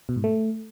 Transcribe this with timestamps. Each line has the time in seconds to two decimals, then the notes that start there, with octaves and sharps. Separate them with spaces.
0.09 B2
0.16 G#2
0.24 A3